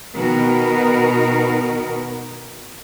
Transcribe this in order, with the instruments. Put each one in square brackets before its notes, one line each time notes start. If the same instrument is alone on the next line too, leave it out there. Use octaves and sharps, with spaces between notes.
[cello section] B2 D#3 B3 F#4 A#4